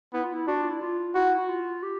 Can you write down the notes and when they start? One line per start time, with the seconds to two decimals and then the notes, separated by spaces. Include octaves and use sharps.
0.14 B3 E4
0.23 F4
0.33 E4
0.48 D4 F#4
0.59 F4
0.70 E4
0.81 F4
1.15 E4 F#4
1.39 F#4
1.48 F4
1.83 G4